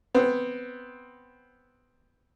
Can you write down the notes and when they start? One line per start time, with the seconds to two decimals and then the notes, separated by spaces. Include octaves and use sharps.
0.15 B3 C4